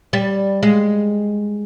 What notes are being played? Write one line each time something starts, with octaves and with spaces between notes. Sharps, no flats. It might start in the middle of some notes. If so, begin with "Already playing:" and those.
G3
G#3